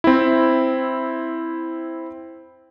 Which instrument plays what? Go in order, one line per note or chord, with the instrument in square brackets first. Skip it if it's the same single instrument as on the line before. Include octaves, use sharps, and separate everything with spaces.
[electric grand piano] C4 E4